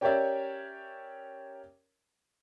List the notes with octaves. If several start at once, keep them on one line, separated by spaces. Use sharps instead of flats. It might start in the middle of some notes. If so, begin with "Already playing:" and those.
C#4 G4 A#4 C#5 D5 E5